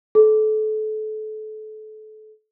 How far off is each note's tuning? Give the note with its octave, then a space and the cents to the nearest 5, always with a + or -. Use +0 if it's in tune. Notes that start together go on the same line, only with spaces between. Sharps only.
A4 -30